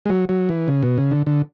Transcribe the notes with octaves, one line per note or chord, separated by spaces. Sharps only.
G#3
F#3
F#3
E3
C#3
B2
C#3
D3
D3